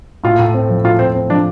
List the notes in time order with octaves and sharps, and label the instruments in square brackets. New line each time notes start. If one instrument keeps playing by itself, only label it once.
[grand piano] A2 [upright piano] F4
[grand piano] A2
C4
F3
[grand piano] A2 [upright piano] F4
[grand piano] A2 [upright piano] C4
[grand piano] C4
[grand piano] F3 [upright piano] D4